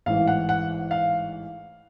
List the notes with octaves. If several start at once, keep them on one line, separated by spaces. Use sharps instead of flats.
A1 G#2 E3 F5
F#5
F#5
F5